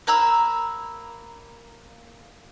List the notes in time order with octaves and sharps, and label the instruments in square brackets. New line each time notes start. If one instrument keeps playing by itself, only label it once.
[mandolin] A#3 A#5 B5 E6